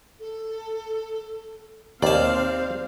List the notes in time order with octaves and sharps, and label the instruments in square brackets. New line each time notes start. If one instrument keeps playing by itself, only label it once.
[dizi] A4
[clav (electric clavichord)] D#2 [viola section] C4 F5 [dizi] C5 [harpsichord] D5 A5